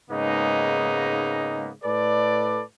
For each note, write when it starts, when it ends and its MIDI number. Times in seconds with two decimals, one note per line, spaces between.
0.10 1.71 44
0.10 1.71 49
0.10 1.71 56
0.10 1.71 58
0.10 1.71 59
0.10 1.71 63
1.84 2.62 45
1.84 2.62 69
1.84 2.62 71
1.84 2.62 74